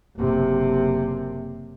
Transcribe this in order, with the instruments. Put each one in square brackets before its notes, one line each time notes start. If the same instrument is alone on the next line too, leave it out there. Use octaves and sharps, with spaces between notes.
[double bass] F#1 C3